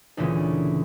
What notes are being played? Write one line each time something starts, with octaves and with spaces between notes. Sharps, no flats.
D2 A#2 C#3 E3 C#4